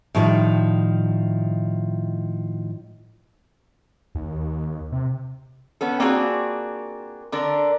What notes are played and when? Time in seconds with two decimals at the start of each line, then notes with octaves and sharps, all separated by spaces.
0.15 A2 D#3 F3 G3
4.15 D#2
4.92 C3
5.81 B3 C#4 A4
6.00 A#3 C4 D4 F4 F#4 G#4
7.32 D3 D4 A#4